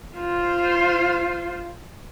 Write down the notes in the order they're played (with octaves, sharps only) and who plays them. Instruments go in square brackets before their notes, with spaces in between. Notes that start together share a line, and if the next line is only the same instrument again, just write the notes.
[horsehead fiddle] F4 C5